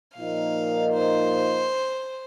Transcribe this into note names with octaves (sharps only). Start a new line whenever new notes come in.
A#2 F3 A#3 D#4 A#4 F5
C5